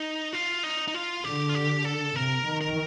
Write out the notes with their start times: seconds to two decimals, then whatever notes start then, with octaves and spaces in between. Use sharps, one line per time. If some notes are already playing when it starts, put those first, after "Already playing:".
Already playing: D#4
0.33 F4
0.63 D#4
0.88 D#4
0.94 F4
1.24 D3 G4
1.49 F4
1.55 G4
1.85 A4
2.16 C3 A#4
2.46 D#3
2.61 A#4